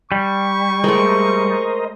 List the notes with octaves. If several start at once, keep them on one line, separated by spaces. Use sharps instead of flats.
G3 C#6
G#3 A3 A#4 C5 D#5